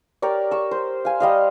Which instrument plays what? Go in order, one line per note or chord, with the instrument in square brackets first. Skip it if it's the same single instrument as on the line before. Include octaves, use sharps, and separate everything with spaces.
[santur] G4 A#4 C#5 D5
C#6 E6
C5
F5 G#5
G3 D#5 F5